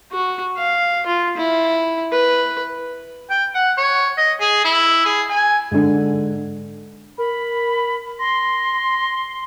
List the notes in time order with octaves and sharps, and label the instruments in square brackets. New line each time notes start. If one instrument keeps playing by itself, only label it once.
[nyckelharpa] F#4
F5
F4
E4
B4
[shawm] G5
F#5
C#5
D#5
G#4
E4
G#4
G#5
[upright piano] G#2 D3
[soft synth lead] A#4 [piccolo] B5
[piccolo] C6 [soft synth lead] A#6